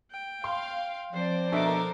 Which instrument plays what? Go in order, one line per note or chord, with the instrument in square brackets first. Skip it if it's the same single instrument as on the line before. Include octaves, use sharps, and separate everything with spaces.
[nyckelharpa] G5
[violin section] F5 [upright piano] C6
[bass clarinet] F3 [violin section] C4 D5 [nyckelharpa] C5
[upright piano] B2 D4 E5 [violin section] A4 A#4 D6